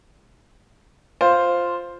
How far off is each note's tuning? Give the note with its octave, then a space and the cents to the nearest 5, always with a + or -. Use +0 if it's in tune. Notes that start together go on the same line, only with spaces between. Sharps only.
F4 +0 C5 +0